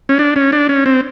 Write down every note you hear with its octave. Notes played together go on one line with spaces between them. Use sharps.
C#4
D4
C#4
D4
C#4
C4